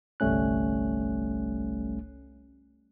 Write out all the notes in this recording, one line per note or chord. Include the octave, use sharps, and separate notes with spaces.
G1 C2 G3 A3 C#4 F#6